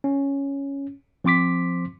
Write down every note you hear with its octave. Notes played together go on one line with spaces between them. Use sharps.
C#4
F3 C4 C6 D6 B6